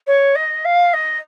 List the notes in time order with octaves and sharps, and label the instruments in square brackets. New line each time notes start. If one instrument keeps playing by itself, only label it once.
[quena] C#5
D#5
F5
D#5